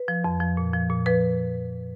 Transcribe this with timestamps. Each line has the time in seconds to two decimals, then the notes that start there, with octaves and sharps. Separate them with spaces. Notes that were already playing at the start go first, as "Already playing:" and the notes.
Already playing: B4
0.08 F3
0.24 F2
0.40 F3
0.57 A#2
0.73 F3
0.90 A#2
1.06 F3 B4